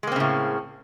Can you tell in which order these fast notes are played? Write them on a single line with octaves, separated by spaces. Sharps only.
G#3 A#3 C4 C#3 A2